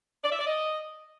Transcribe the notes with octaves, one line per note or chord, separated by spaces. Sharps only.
D5
E5
D5
D#5